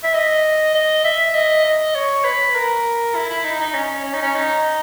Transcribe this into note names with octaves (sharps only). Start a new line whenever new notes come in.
E5
D#5
D#5
E5
D#5
D#5
C#5
B4
A#4
E4
E4
D#4
D#4
C#4
C#4
D#4
C#4
D#4